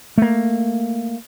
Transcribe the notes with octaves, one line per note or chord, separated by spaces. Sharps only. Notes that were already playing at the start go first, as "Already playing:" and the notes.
A3 A#3